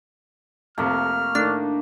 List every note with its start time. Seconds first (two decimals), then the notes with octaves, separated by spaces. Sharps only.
0.78 F2 C3 A3 A#3 F6
1.35 A2 D#3 D4